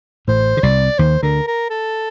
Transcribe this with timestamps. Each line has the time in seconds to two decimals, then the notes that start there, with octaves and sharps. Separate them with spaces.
0.27 A1 A2 C5
0.57 D3
0.63 C2 C3 D5
0.98 D#2 D#3 C5
1.23 D2 D3 A#4
1.47 A#4
1.70 A4